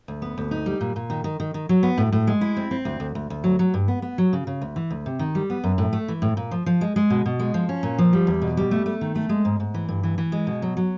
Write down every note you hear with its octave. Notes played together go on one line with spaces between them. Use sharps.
D2
B3
D2
D#4
G3
A#2
A#2
D#3
D#3
D#3
D#3
F#3
B3
A2
A2
G#3
E4
C4
C4
D2
D2
D2
D2
F#3
F#3
G2
B3
B3
F#3
C#3
C#3
D2
E3
D2
C3
D#3
G3
B3
F#2
A2
A3
E3
A2
A#2
F3
F3
G#3
G#3
B2
B2
G#3
F3
C#4
A#2
F3
G3
E2
B2
G3
A3
A3
D#3
A3
G#3
G#2
G#2
E3
G2
E3
E3
G#3
B2
F#3
F#3